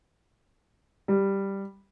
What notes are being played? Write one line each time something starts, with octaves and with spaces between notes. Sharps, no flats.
G3